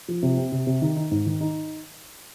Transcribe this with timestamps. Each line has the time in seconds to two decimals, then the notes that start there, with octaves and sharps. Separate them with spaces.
0.08 F3
0.23 C3
0.37 C4
0.52 C3
0.67 C3
0.82 D#3
0.97 D#4
1.11 G#2
1.26 D#3
1.41 D#4